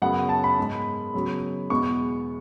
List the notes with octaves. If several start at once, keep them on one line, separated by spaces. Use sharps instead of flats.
F#2 C#3 F#3 B3 F#5
A5
B5
G#2 G#3 B3
C#3 F#3 B3
E2 B2 G#3 B3 C#6